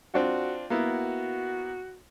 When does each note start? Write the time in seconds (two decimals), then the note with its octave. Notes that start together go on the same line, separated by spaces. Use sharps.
0.14 C4 D4 F4 F#4
0.70 A#3 B3 E4 F#4